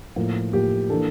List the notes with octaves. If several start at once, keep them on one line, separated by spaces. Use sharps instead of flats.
A2 F3 A#3
A2 F3 A#3 G4
E3 A#3 D4 A4